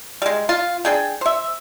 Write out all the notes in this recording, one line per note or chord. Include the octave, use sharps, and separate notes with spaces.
G3 G#3
F4
D4 G#4 G5
C5 E5